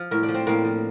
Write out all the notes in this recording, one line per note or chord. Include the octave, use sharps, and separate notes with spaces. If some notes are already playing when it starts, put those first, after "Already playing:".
Already playing: F3
A2 A#4
D4
F3
C4
A2 A#3
F3